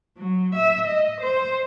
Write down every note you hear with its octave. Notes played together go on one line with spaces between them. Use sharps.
F#3
E5
D#5
C5